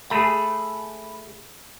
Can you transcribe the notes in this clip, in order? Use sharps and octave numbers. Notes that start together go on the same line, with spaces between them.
A3 G#4 B5